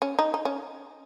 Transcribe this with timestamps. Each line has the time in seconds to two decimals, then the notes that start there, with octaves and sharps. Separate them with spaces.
0.02 C#4
0.19 D#4
0.34 D#4
0.45 C#4